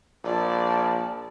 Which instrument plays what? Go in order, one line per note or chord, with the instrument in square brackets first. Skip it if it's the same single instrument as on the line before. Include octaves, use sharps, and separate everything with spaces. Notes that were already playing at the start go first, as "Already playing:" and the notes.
[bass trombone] A#1 [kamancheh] D5 A5